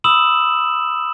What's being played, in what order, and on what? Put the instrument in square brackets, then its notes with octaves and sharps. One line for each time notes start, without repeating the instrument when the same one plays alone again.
[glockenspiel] B5 D#6 E6 E7 F#7